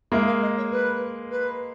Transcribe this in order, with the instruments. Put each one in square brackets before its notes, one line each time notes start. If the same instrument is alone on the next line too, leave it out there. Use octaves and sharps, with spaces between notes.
[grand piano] G#3 A#3 [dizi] E5
[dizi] F5
D#5
C#5
B4
B4